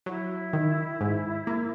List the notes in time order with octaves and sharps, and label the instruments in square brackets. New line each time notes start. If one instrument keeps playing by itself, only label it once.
[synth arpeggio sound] F#3 [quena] E4
[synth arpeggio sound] D#3
G#2
A#3